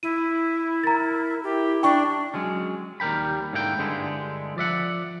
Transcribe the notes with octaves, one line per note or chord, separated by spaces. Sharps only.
E4 D#7
A#4 A#5 A6
E4 G4
D4 G5 C#6
F#3 G#3 C#4
D#2 G3 A#4 G5 B5
G#2 D3 A#3 E4 A#4 G5
G2 D3 G#3 E4
F3 D5 E5 F#5